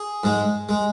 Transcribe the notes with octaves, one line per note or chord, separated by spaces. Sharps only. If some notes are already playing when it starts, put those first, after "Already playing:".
Already playing: G#4
G#2 G#3
G#3